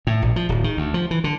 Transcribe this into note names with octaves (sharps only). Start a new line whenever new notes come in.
A2
A#1
F3
D1
D#3
D2
F3
E3
D3